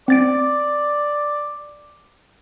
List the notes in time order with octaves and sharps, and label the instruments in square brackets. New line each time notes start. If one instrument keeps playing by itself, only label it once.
[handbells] C4 A6 D7 [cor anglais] D5